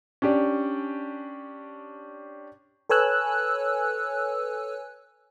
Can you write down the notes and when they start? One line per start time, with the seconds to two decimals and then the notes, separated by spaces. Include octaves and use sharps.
0.22 C#4 D4 G4 D5
2.89 A4 B4 C#5 G#5 E6 F#6